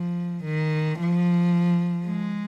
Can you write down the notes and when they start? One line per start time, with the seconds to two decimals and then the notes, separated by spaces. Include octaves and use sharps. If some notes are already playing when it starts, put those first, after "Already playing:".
Already playing: F3
0.44 D#3
0.99 F3
2.06 G#3